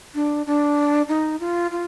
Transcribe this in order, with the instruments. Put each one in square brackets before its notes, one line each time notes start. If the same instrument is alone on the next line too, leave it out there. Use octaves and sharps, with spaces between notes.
[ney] D4
D4
D#4
F4
F4